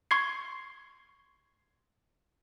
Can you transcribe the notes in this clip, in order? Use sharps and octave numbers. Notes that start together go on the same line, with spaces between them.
C6 C#6 G#6 C7